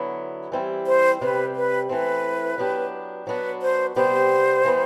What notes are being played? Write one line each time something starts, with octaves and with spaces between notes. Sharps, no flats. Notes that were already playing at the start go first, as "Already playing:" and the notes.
Already playing: D3 F#3 B3 E4
E3 G3 C4 E4 G4
C5
C3 G3 C4 G4 B4
B4
E3 A3 C4 B4
F#3 B3 D4 G4
F#3 B3 D4 F#4 B4
C5
C3 G3 B3 D4 G4 C5
E3 G3 B3